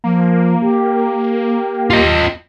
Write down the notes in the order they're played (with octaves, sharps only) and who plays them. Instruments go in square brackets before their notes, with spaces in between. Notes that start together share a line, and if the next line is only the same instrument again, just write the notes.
[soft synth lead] F3 [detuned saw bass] A#3
[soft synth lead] G4
[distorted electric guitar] F4 D#5